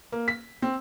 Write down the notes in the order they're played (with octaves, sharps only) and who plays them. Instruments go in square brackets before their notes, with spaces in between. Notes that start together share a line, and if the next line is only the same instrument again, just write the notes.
[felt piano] A#3
B6
C4